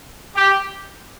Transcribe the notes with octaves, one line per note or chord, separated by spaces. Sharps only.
G4